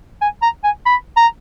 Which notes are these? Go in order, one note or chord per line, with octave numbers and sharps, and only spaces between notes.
G#5
A#5
G#5
B5
A#5